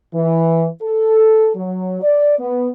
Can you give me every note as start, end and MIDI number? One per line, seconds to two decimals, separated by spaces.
0.14 0.66 52
0.82 1.50 69
1.56 2.01 54
2.02 2.37 74
2.39 2.69 59